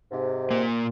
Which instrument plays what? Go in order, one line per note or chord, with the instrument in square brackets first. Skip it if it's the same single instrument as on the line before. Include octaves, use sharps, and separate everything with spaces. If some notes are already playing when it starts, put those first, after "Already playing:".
[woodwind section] G#2 C3
[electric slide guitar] A#2 A#3